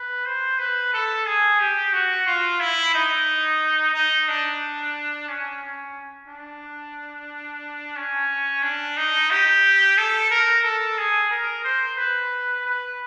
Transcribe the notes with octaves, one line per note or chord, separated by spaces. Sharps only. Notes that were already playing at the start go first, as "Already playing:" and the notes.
Already playing: B4
C5
B4
A4
G#4
G4
F#4
F4
E4
D#4
D#4
D4
C#4
C#4
D4
C#4
D4
D#4
G4
A4
A#4
A4
G#4
A#4
C5
B4
B4